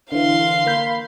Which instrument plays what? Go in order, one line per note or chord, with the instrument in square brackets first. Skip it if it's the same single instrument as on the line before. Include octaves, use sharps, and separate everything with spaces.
[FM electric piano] D3 E3 [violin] F5 C6
[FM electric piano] A#3 B5 G6